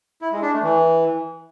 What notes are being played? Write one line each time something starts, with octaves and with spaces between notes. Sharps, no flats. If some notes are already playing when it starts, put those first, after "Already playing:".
E4
G#3
D4
A3
E3